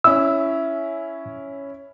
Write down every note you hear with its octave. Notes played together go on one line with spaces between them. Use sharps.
C#4 E4 E6